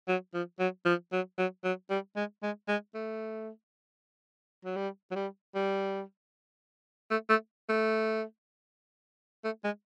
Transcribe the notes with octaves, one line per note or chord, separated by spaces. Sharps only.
F#3
F3
F#3
F3
F#3
F#3
F#3
G3
G#3
G#3
G#3
A3
F#3
G3
F#3
G3
G3
A3
A3
A3
A3
G#3